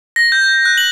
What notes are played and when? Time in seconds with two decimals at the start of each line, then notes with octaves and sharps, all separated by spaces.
0.16 A#6
0.32 G6
0.65 F#6
0.78 F#7